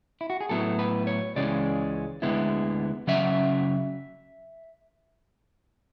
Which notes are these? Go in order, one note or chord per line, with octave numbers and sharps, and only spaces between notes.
E4
F#4
G#4
A2 F#3 B3 E4 A4
B4
C#5
C#2 C#3 E3 G#3 C#4 D5
D2 D3 G#3 B3 E4
C#3 F#3 C#4 E5